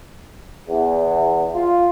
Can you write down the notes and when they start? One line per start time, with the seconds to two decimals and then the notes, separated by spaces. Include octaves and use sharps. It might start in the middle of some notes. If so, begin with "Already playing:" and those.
0.69 E2
1.55 F4